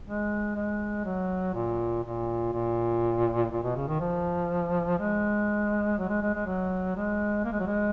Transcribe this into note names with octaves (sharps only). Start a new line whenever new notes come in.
G#3
G#3
F#3
A#2
A#2
A#2
A#2
B2
C#3
D#3
F3
G#3
F#3
G#3
G#3
G#3
F#3
G#3
A#3
G#3
F#3
G#3